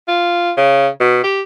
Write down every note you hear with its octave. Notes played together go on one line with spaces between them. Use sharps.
F4
C#3
B2
G4